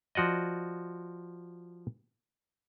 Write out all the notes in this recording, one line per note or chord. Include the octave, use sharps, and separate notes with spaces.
F3 F#4 D5 D#5